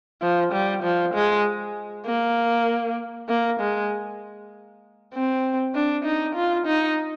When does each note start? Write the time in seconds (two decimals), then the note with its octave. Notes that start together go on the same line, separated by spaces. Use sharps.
0.22 F3
0.53 G3
0.83 F3
1.14 G#3
2.06 A#3
3.28 A#3
3.60 G#3
5.13 C4
5.75 D4
6.05 D#4
6.35 F4
6.66 D#4